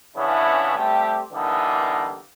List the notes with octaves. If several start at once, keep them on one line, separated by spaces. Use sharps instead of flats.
C#3 E3 B3 C#4 D4 E4
G3 A3 C4 G4
D3 E3 G3 A#3 B3 D#4